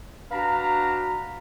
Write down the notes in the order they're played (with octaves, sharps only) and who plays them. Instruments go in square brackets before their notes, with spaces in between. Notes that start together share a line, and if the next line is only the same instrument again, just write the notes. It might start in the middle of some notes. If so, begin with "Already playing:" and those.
[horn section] D4 F#4 B4 F5 A#5